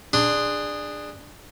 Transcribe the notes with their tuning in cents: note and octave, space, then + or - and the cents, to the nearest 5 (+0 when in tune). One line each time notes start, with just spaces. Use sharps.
D4 +15 G#4 -15 C6 +0